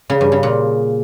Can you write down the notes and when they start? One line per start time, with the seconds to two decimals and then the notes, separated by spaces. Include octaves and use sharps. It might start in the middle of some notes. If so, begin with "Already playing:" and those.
0.10 C#3
0.21 G2
0.32 C#3
0.43 A#2